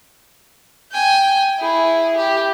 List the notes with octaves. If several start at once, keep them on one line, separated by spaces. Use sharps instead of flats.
G5 G#5
E4 G#4
G4